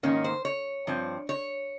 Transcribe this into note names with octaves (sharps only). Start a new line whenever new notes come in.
G#2 D#3 A#3 C#4
C5
C#5
G2 F3 C4
C#5